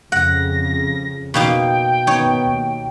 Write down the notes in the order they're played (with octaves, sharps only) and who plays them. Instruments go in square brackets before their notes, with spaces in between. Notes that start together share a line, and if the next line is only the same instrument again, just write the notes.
[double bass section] F2 C#3 [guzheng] F#5 [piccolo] A#6
[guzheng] B2 A#3 D#4 [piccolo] G5
[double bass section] D#3 B3 [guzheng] D#4 C#5
[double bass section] D#2